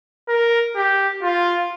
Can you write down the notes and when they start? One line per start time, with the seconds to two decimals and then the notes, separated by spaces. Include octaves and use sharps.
0.29 A#4
0.76 G4
1.23 F4